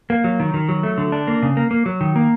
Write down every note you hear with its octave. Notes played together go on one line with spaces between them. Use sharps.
A#3
F#3
D#3
D#3
F#3
A3
D3
D4
A#3
C#3
A#3
A#3
F#3
D#3
A#3